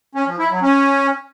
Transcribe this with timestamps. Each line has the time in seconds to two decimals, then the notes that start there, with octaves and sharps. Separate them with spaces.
0.15 C#4
0.27 F3
0.39 E4
0.50 F#3
0.62 C#4